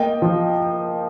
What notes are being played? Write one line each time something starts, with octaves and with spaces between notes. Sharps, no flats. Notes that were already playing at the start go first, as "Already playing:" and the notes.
Already playing: A#3 D#5 G5
F3